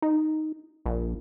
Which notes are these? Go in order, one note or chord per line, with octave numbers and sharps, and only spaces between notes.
D#4
A#1